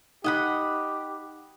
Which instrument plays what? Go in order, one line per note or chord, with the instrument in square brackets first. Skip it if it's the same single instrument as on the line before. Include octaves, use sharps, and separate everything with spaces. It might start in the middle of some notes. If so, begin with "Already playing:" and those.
[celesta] D#4 F#6 [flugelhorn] G4 [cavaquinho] D#5 F#5 B5